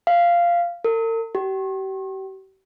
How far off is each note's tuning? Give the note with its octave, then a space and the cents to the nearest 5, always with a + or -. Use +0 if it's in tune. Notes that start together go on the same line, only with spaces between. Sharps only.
F5 -10
A#4 -45
G4 -40